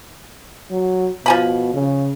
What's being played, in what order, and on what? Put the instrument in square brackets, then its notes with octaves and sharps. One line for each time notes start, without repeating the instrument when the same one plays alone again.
[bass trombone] F#3
[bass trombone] B2 [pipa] F3 G#5 B5
[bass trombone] C#3